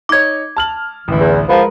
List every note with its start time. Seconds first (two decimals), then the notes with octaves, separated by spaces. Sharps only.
0.09 D#4 C#5 D6 G#6
0.57 A5 F6 F#7
1.08 A1 D2 E3
1.20 E2
1.49 F3 G#3 B3 A#4 B4